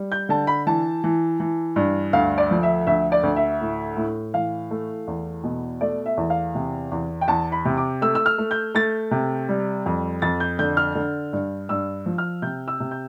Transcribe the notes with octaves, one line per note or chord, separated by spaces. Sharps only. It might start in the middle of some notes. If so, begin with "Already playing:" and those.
Already playing: G3
G6
D3 A5
B5
E3 A5
E3
E3
G2
D2 F5
D5
F3
E5
D2 E5
D5
D2
E5
A2
A2
E3 F5
A3
E2
B2
A3 D5
E5
E2
F5
C3
E2
G5
E2 A5
B5
C3
D6
A3 E6
E6
F6
A3
G6
A3 A6
C3
G3
F2
F2 A6
G6
D3 G6
F6
D3
G2
G2 E6
F3
F6
C3 G6
E6
C3
G6